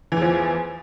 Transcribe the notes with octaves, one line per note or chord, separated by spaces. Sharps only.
E2 E3 F3